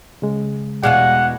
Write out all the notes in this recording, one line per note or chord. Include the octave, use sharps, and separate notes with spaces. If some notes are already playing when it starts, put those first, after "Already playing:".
C#3 G#3
E2 B2 G#3 D5 F5 F#5 G#5